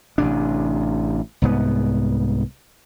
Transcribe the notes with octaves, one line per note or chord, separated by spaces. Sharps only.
A1 C3 D4
C2 G#2 B3